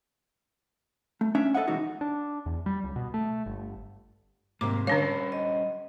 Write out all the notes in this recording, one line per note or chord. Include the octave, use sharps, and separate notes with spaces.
A3
C#4 D4 E5
A4 B4 D#5 E5 F#5
B2 E3 G#3 D#4 F#4
D4
E2
G3
C#2
B2
A3
G1
G#2 C3 D#3 A#3 D6
D3 G3 C#4 D4 C5 C#5 F5
D#5